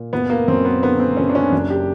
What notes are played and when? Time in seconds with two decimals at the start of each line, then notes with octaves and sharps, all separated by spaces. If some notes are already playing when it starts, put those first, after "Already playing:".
Already playing: A#2
0.13 F#1 B3
0.30 A#3
0.48 F#2 C4
0.65 B3
0.82 D3 B3
0.99 C4
1.17 F#1 C#4
1.29 D4
1.35 C#4
1.52 F#2 D4
1.70 G4